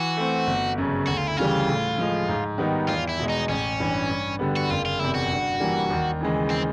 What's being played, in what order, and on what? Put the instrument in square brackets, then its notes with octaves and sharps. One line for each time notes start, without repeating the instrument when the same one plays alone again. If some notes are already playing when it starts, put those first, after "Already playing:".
Already playing: [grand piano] E3 [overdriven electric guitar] F#4
[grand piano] A3 C4
G1
F#2 C#3
[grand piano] D2 [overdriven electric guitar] F#4
[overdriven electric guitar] F4
E4
[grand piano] C#3 E3 G3 [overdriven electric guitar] F4
[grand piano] A2
F3 G#3
G#2
D#3 G3 B3 D#4
[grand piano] E2 [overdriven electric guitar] F4
[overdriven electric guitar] E4
[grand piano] B2 G#3
[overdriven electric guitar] D#4
[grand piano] A1 [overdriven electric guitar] C#4
[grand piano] G2 E3
G2
D3 G3 B3
[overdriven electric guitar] F#4
[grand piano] F#1 [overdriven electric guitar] F4
[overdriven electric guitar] F4
[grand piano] E2 C3 [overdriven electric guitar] E4
[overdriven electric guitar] F#4
[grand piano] G2
E3 G3 A#3
D#2
C#3 E3 G#3
[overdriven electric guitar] C4